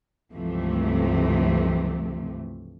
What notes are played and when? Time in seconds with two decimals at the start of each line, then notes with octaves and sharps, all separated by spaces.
0.33 C#2 G2 C3 E3 F3 A3